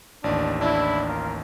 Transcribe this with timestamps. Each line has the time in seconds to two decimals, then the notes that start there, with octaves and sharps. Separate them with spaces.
0.24 A1 D#2 D4
0.61 D4 E4
1.06 F4 A#4